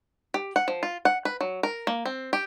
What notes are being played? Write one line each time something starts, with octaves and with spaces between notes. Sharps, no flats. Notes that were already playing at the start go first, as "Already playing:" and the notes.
G4
F#5
F3
F4
F#5
B4
F#3
A#4
A#3
C4
G4